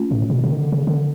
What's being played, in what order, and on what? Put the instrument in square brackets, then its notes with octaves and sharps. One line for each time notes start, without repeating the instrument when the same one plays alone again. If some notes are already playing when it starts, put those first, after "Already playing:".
Already playing: [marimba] A3 C#4 F4
[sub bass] A2
B2
C#3
D#3
D3
C#3
D3